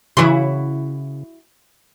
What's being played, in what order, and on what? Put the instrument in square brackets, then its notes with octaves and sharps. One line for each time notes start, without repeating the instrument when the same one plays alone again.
[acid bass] C#3 [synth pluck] E3 C6 [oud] E4 F#4